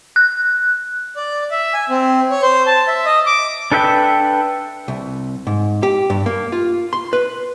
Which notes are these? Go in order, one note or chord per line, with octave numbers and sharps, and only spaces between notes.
F#6
D5
E5
G#5
C4
C#5
C5
A5
E5
D#5
D6
D4 A4 B4 E5 G5
C2
G#2
G4
G2
A#3
F4
C6
B4